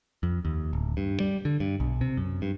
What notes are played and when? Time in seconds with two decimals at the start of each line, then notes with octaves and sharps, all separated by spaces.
0.23 F2
0.45 D#2
0.73 D1
0.97 G2
1.20 G3
1.45 D3
1.60 G2
1.80 B1
2.01 C3
2.17 F#2
2.42 G2